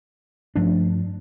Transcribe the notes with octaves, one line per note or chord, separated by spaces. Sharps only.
G2 F3 A3 D4